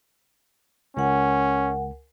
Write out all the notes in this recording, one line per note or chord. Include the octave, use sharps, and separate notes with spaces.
C#2 C#4 A#4 F#5 G#5